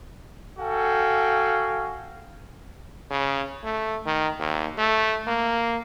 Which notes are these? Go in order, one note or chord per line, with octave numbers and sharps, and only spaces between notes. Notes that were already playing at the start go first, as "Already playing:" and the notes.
F#4 A4 F5 G5 G#5
C#3
A3
D#3
D#2
A3
A#3